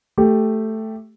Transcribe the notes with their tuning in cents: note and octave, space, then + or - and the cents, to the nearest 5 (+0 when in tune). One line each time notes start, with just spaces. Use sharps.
A3 +0 G4 +0